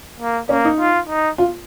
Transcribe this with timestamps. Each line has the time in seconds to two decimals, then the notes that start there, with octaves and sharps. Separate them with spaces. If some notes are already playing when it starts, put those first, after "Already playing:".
0.20 A#3
0.49 A#3 C#4
0.65 D#4
0.79 F4
1.09 D#4
1.38 F4